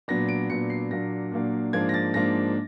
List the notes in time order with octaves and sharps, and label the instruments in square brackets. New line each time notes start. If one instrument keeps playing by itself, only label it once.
[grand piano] A#2 F#3 B3 D4 A#6
D7
A#2 F#3 B3 D4 C#7
C7
A#2 F#3 A#3 D4 A#6
A#2 F#3 A#3 D4
G#2 F3 A#3 D4 G#6
A#6
A6
G#2 F3 A#3 D4 A#6